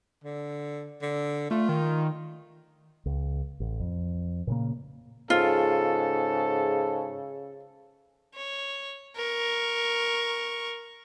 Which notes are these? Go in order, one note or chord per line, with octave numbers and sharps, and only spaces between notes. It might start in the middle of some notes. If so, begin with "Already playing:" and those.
D3
D3
A3 F4
D#3
C#2
A1
F2
A#2 C#3 A#3
G#2 C#3 F4 A4
C#5
A#4 C#6